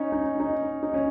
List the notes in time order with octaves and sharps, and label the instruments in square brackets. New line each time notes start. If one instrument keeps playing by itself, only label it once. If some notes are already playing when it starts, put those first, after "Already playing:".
Already playing: [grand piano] C#4 D#4
D#4
D#4
D#4
C#4